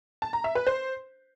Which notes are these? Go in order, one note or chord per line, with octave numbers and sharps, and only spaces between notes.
A5
A#5
E5
B4
C5